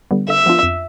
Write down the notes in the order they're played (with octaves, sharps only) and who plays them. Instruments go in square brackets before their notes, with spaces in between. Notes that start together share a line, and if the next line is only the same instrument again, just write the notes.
[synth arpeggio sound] D3 G3 B3
[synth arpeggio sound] D3 [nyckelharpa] E5
[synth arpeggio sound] F3 B3 D4 F4
F2